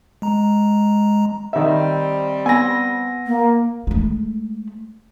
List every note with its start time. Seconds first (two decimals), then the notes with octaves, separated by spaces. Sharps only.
0.22 G#3 A#5
1.53 D#3 G3 C4 E5
2.46 B3 G#5 A#6
3.27 A#3
3.87 G#3 A3